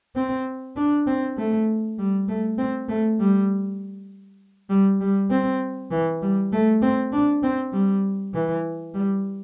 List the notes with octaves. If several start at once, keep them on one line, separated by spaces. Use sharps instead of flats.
C4
D4
C4
A3
G3
A3
C4
A3
G3
G3
G3
C4
E3
G3
A3
C4
D4
C4
G3
E3
G3